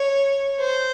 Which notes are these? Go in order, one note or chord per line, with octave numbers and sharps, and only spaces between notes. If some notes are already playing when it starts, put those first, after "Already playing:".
Already playing: C#5
C5